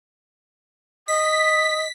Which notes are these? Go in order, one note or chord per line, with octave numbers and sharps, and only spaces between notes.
D#5 D#6 B6